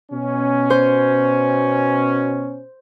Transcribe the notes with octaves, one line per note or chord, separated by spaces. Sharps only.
B2 C#4
C5